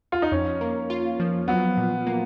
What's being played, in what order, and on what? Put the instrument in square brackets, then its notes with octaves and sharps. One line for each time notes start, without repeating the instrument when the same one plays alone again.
[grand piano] F4
D#4
[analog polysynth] F2 [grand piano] C#4
[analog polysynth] A#3
F4
F3
[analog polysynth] F#3 [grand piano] B3
[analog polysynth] A#2
A#3